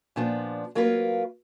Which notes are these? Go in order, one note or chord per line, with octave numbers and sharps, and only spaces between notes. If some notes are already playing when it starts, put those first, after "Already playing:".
A#2 F3 B3 D4
F#3 A#3 F4 B4